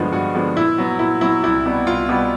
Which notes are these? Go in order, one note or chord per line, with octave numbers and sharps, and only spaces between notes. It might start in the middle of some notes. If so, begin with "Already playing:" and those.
Already playing: G2 D3 F3 G#3 B3
G2 F#4
D3 F3 G#3 B3
A#2 E4
F#3 B3
A#2 E4
F#3 B3 E4
C2 E4
B2 G3 B3
C2 F4
B2 G3 B3